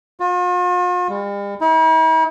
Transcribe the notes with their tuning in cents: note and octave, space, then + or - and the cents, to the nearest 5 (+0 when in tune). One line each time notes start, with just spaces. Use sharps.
F4 +45
G3 +45
E4 -45